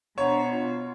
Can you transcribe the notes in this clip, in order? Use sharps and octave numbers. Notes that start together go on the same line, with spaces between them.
B2 D4 C5 C#5 F#5 A#5
F4